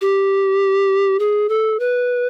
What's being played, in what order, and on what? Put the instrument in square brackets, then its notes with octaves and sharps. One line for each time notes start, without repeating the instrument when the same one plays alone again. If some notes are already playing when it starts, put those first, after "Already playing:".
[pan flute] G4
G#4
A4
B4